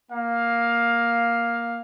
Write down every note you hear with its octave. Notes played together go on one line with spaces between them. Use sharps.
A#3 F5